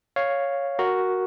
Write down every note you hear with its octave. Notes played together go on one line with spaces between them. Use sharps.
C#5 F5
F#4 A#4